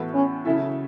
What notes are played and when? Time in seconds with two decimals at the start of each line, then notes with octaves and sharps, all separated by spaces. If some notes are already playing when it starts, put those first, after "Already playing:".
Already playing: A2 E3 B3 F#4 A4
0.14 C#4
0.45 C#3 F#3 C#4 E4 A4 E5